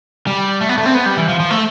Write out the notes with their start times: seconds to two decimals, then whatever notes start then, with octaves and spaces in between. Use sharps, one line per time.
0.27 G3
0.61 A3
0.69 B3
0.78 A3
0.86 C4
0.94 B3
1.06 G3
1.17 E3
1.29 F3
1.40 F3
1.51 A3